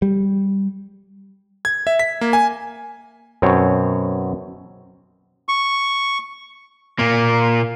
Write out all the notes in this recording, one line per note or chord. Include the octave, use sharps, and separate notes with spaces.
G3
G#6
E5
B6
A#3
G#5
F#2 B2 C4 C#5
C#6
A#2 A#3